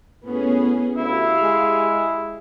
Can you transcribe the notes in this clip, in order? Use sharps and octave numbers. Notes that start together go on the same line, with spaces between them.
A2 B3 C#4 G#4
D2 E4 G4 F5
G#3